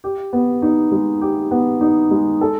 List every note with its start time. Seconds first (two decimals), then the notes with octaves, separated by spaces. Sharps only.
0.04 G4
0.33 B3
0.62 D#4
0.92 G#3
1.21 G4
1.51 B3
1.81 D#4
2.11 G#3
2.41 A4